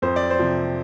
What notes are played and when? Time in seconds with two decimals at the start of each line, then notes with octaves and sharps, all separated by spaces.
0.02 F2 C5
0.16 D5
0.30 C5
0.39 C3 F3